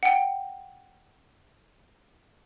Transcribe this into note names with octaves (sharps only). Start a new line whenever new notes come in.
F#5 G5